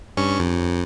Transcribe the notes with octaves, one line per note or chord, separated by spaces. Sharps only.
G2 C#4 C#6
F2